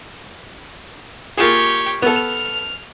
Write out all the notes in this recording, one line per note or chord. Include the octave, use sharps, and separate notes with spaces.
A#3 F4 G4 G#4 C#5
B3 A4 F6